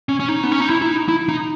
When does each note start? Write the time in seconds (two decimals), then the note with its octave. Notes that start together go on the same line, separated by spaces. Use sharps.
0.09 C#4
0.20 C#4
0.29 D#4
0.43 B3
0.52 C#4
0.60 D#4
0.70 E4
0.82 E4
0.88 D#4
1.09 E4
1.29 D#4